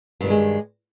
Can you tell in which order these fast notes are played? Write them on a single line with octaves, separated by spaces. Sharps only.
G2 D#3 G3 G#3